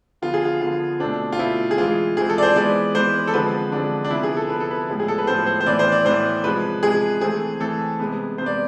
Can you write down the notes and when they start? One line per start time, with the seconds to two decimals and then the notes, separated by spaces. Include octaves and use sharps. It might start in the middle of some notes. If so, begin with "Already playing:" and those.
0.22 D3 F3 B3 F4
0.34 G#4
0.45 F4
0.61 D3 F3 B3 F4
1.00 B2 A3 C4 D4
1.33 F4
1.39 B2 A3 C4 E4
1.71 G#4
1.78 E3 G#3 C4 F4
2.17 E3 G#3 C4 G#4
2.30 A4
2.38 D5
2.43 C5
2.56 E3 G#3 B3 D5
2.94 E3 G#3 B3 C5
3.28 A4
3.33 D3 F3 G#3 C4 B4
3.72 D3 F3 G#3 C4 D4
4.04 D4
4.11 C3 F3 B3 E4
4.23 G#4
4.37 A4
4.49 C3 F3 B3 B4
4.60 A4
4.71 B4
4.89 A2 F3 G#3 B3
5.00 G#4
5.08 A4
5.18 B4
5.27 A2 F3 G#3 B3 C5
5.47 C5
5.61 C5
5.66 A2 E3 B3 D5
5.79 C5
5.92 D5
6.05 A2 E3 B3 C5
6.44 C3 F3 G#3 B4
6.83 C3 F3 G#3 G#4
7.21 E3 A3 C4 G#4
7.60 E3 A3 C4 A4
7.99 C3 G#3 B3
8.38 C3 G#3 B3 C5
8.46 D5